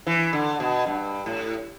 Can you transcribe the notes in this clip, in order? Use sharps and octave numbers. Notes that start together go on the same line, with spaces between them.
E3
D3
B2
G2
A2